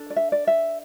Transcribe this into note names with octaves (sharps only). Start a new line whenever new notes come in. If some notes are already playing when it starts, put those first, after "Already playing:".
Already playing: D4 A4
D5
E5
D5
E5